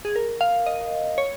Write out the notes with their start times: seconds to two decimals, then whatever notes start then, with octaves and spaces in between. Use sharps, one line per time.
0.05 G#4
0.16 A#4
0.41 F5
0.66 D#5
1.18 C#5